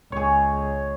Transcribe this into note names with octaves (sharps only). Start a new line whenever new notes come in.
C#2 G#4 C#5